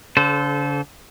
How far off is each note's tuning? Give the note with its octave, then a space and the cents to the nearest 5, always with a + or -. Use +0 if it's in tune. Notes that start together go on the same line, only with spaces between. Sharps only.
D3 -45 A4 -25 C5 -20